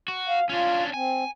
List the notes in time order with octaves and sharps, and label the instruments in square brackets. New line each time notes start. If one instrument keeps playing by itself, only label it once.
[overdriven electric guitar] F#4
[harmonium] F5
[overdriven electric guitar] C#4 D4 [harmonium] F4
[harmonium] C4 [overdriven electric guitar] G#5